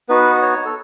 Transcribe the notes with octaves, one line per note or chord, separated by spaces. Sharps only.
B3 D#4 F#4 B4
C#5
A4